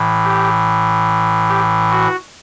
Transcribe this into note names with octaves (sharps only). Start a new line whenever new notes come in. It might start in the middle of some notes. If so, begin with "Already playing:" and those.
Already playing: A2 E3
G4
G4
F#4